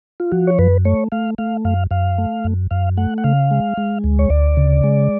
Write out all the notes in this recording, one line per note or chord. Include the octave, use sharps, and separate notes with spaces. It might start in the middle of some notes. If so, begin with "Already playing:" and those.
F4
F3 F#4
C#5
F#2 B4
A3 C#5
A3 F5
A3 F5
F#2 F5
F#2 F5
A3
F#2
F#2 F5
A3 F#5
F#5
C#3 F5
G#3
G#3
D2
C#5
D2 D5
C#3
G#3